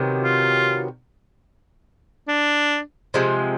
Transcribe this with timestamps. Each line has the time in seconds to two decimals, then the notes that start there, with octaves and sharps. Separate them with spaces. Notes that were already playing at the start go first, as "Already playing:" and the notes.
Already playing: C3 D#3 F#3 B3
0.23 F4
2.28 D4
3.14 C3 F3 G#3